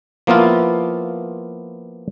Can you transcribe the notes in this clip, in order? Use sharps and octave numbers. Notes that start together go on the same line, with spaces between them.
F3 A#3 B3 E4 F4